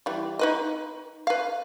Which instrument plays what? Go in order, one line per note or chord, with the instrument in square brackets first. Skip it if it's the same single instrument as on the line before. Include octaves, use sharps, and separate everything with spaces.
[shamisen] E3 G3
D#4 B4 D#5
B4 F5